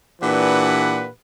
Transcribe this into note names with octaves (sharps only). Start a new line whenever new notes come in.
A#2 E3 D4 G4 B4 F#5